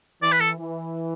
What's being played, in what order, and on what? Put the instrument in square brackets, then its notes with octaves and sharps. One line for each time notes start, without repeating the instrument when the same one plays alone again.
[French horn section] E3 [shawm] D5
[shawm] B4
A4
[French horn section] E3